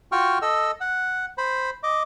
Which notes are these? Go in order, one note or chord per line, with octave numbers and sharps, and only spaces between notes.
F4 F#4 G5 C#6 F6
A4 D#5 E6
F#5
C5 B5
D#5 D6